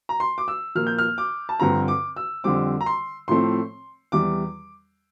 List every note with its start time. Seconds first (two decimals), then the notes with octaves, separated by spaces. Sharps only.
0.09 A#5
0.20 C6
0.38 D6
0.48 E6
0.75 A#2 F3 A#3 F6
0.87 G6
0.98 F6
1.18 D6
1.49 A5
1.60 G2 D3 F3 C4 A#5
1.88 D6
2.16 E6
2.44 F2 D3 G3 C4 D6
2.81 A#5
2.86 C6
3.28 A2 F3 A3 C4 C6
4.12 E2 E3 G3 D6